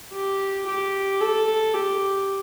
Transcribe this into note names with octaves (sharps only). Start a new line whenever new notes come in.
G4
G4
A4
G4